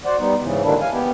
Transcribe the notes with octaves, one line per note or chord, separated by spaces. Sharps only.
F#4 C5 D5 F#5
G3 B3 D#4
G#2 C#3 E3
D3 D#3 G3 A#3 D4 E4
F5 G#5
B3 G4